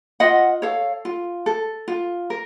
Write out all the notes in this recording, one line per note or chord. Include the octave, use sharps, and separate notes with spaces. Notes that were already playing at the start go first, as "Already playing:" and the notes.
F4 D#5 F#5
A4 C#5 F5
F4
A4
F4
A#4